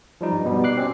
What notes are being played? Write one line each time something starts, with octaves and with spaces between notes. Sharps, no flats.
F3 G3 D#4
G2
B2 G3 B3
D6 F#6 C7
C4 C#4 C5